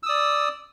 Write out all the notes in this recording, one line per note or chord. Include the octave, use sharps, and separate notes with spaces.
D5 D#6 E6